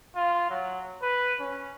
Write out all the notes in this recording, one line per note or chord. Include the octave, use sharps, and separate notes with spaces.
F4
F#3
B4
C#4